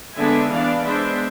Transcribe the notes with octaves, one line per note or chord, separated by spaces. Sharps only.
D3 G#3 B3 D4 E5 G#5
E3 B3 D4 D5 F5
G#3 B3 D4 C5 E5